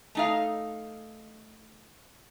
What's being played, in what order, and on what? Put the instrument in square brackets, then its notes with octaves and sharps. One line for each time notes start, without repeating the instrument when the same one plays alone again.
[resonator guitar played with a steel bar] A3 D#4 F5